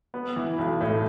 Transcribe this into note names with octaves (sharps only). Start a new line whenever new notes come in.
B3
E3
B1
A2